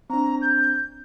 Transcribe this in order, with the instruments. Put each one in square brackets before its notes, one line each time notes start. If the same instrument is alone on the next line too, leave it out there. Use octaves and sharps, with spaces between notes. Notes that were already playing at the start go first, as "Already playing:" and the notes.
[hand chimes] C4 D4 [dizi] A#5
[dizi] G6